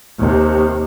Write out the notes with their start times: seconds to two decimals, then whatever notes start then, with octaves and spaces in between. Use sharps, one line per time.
0.19 D#2 C3